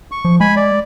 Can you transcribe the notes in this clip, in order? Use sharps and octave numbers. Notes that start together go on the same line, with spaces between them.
C#6
F3
G#3 G#5 B5
D5